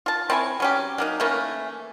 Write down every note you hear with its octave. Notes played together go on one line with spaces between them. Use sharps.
F4 A5
C4 E4 C#5 G#5
F#3 C#4 G4
F#3 A#3 D#4
E3 A3 A#3 C#4